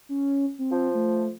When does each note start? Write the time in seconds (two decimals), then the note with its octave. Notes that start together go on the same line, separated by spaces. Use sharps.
0.09 C#4
0.59 C4
0.71 F3
0.95 A3